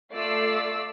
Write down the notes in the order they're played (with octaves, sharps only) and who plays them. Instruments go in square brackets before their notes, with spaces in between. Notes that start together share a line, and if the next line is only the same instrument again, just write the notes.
[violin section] A3 F4 D5 E6 C7